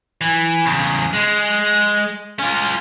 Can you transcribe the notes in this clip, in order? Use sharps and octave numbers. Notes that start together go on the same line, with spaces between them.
E3
E2 C#3
G#3
C#4 F4